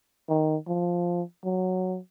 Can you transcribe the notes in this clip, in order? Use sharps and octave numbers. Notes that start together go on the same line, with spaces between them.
D#3
F3
F#3